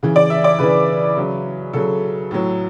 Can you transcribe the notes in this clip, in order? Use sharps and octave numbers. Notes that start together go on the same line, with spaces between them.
C#3 E3
D5
E5
D5
C#3 E3 B4
C#3 F#3
C#3 F#3 A4
A2 F#3